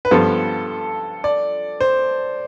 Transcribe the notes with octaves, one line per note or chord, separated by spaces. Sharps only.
B4
G2 F3 B3 F4 A4
D5
C5